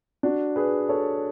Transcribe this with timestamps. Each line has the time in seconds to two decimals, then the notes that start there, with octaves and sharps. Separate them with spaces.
0.23 D4 F#4
0.56 G#4 B4
0.89 A4 C#5